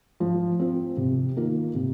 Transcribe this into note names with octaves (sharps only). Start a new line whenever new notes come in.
F3
C4 F4
C3
D#3 A#3 F4 A#4
C3